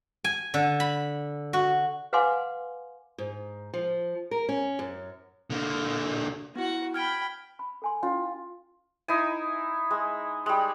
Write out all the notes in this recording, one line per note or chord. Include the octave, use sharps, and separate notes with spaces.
G#5
D3
B5
F#4
B4 F5 F#5 G#5 C6 D6
G#2
F3
A#4
C#4
F#2
D3 A#3
B3 E4 F#4 F#5
G5 B5 F6 G#6 D7
B5
A4 G#5 C6
C#4 E4 F4
D#4 E4 G#5
G#3
G3 G#3